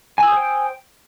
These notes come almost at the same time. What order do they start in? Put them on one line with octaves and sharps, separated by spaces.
G#5 E6 D#6 C5 G5